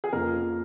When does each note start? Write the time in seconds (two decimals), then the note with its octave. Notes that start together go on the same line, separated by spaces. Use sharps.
0.04 G#4
0.12 F2 C#3 F3 A#3 A#4